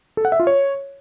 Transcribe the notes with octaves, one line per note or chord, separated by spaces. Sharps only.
A4
F#5
E5
F4
C#5